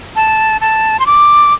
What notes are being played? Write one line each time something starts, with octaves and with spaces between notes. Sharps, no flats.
A5
A5
C6
D6